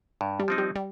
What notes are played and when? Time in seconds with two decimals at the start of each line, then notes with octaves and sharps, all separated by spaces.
0.21 G2
0.39 G3
0.48 F3 C4 D#4
0.58 G3
0.76 G3